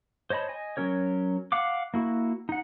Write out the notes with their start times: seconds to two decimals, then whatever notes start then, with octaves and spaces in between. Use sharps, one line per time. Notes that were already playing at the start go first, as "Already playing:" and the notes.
0.30 C5 C#5 D#5 A5 B5
0.49 D#5 G#5
0.77 F#3 C#4 A#4 C#5
1.52 F5 F#5 D6
1.94 A#3 E4 F#4
2.49 D#4 F#5